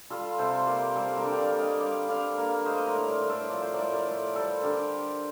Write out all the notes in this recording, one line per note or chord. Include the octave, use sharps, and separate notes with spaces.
G3 F4 A4
C3 A4 C5
C5
A#3 A#4 D5
G3 A4 C5
A#4 D5
D3
G5
D5 F5
A#3
D#5 G5
G3 D5 F5
D3 D5 F5
A#3
A3 C5 D#5
A#4 D5
A2
A#4 D5
A2
A4 C5
F3 D5
C5
A2 A#4 D5
A#4 D5
A3
G3 A4 C5
D3 G4 A#4